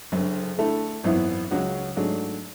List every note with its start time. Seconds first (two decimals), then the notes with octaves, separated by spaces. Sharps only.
0.12 F#1 F#2 D3
0.57 D3 A3 E4 A4
1.04 G#1 F#2 E3 B3 E4
1.51 C#2 C#3 F#3 C#4 F#4
1.96 G#2 F#3 A3 D4 G#4